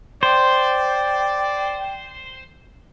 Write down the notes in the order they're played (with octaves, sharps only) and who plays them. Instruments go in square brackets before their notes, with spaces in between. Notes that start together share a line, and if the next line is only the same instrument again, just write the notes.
[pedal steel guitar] C5 [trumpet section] D5 [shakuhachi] G5